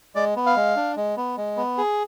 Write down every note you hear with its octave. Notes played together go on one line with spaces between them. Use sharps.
G#3 D5
B3
F5
G#3
D4
G#3
B3
G#3
B3
G#4